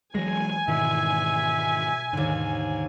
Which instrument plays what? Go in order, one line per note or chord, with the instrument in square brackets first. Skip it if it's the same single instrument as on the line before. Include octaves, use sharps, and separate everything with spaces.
[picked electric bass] E3 F#3 G#3 [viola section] G#5 [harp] A#6
[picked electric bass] G#2 D#3 E3 [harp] B2 [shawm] E5
[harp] D#2 D3 [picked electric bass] G#2